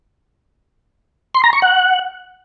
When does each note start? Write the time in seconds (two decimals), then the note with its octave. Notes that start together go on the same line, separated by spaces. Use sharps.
1.35 C6
1.44 A#5
1.53 C#6
1.62 F#5